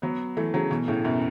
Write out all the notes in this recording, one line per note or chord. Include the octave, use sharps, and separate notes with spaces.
F#3 B3
E3 A3
C#3 F#3
B2 E3
A2 C#3
F#2 B2